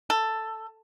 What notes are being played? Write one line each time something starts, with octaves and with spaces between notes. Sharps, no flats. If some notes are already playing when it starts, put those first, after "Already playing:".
A4